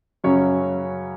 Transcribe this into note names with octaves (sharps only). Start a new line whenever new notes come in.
F#2 C#3 F#3 C#4 C#5